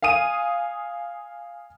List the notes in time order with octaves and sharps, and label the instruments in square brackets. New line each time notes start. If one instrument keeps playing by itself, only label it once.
[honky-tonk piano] F5 G#5 D#6 D#7